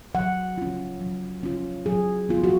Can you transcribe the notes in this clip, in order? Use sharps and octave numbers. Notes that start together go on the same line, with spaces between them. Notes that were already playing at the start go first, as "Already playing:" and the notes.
F#3 F#5
C#4 F4
F#3
C#4 F4
F#3 G#4
B3 F4
F#4